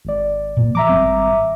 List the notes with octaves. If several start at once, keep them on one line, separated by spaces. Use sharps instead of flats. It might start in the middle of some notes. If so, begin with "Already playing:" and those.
G#1 D5
A#2 A#3
F3 E5 A#5 D6
G#1 G3 C4